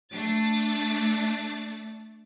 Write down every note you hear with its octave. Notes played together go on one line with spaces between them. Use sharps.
A3 D4 A6